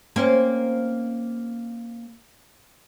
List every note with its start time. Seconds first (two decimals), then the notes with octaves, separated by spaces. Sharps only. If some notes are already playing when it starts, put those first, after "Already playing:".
0.16 A#3 C4 C#4